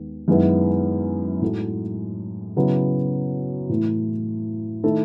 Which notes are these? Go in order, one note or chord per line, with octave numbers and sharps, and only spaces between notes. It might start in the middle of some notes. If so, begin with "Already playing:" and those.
Already playing: D#2 D#3 G#3 B3
F#2 D#3 G#3 B3 E4
A2 G#3 D#4 F#4 A4
C#3 F#3 B3 E4
A2 E3 A3 E4
D#3 A3 E4 A4